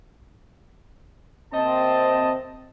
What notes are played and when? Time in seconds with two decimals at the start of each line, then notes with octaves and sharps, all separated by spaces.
1.54 C3 A#3 C4 D#5 A5